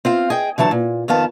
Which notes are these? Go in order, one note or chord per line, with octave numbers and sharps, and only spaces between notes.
C4 F4 F5
G#4 D#5 G5
D3 E3 F#3 A5
A#2
F2 D#3 B3 F5 A5